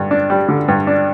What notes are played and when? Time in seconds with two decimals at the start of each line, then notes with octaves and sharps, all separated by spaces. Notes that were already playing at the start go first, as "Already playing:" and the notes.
Already playing: G2 D3
0.11 D4
0.30 G3
0.49 D3
0.68 G2
0.87 D4